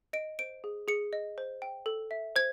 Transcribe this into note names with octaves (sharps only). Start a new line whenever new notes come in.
D#5 D7
C5 D7
G#4
G#4 C#7
D#5
C5
G5
A4
E5
C5 G#6